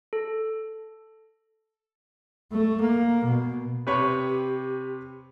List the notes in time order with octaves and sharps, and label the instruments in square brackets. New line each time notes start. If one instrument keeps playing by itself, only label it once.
[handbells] A4
[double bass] A3
A#3
B2
[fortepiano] C3 B4 C#5 [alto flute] G4